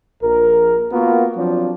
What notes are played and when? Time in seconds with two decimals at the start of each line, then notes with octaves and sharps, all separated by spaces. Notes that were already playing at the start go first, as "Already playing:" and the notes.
0.23 A#1 A#4
0.92 A#3 B3 F4 F#4 A#4
1.36 F3 F#3 C4 D4 F4